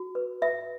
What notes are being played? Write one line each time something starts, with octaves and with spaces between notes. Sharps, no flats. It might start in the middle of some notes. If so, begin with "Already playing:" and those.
Already playing: F#4
B4
B4 E5